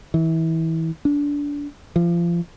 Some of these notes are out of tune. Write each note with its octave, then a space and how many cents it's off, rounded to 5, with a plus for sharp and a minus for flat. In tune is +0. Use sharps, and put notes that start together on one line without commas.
E3 -25
D4 -25
F3 -30